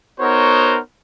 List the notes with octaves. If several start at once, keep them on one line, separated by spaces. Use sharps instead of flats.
B3 D#4 F#4 A#4 C5 C#5